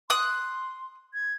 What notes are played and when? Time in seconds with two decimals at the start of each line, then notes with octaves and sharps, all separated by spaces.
0.10 C6 D#6 F#6
1.14 G#6